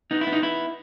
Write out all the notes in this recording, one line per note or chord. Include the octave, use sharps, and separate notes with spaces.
B3 D#4
E4
B3
D#4
B3 E4